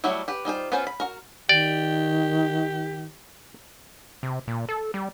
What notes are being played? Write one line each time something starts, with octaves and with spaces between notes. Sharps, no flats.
F#3 G3 A3 E4 F#4
G4 B4
G3 D#4 F4 C5
B3 C#4 F4 B4 C5
B5
F#4 A#4
D#3 G4 D5
C3
A#2
A4
G3